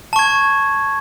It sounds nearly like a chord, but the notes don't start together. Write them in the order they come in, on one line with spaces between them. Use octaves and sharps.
A5 C#6 G#6